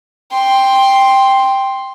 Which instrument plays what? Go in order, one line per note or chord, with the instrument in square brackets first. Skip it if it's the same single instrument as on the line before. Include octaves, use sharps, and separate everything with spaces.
[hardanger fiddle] G5 C6